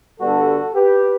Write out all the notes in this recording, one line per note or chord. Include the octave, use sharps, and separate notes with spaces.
G2 D3 G3 B3 F#4 A4
G4 B4